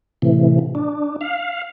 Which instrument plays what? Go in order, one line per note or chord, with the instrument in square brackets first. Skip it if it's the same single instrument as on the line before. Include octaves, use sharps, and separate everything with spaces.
[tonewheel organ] A2 C3 E3
D4
F5